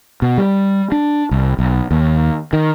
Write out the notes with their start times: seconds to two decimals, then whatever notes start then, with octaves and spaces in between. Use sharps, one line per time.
0.22 B2
0.38 G3
0.92 D4
1.31 C2
1.59 B1
1.91 D#2
2.53 D#3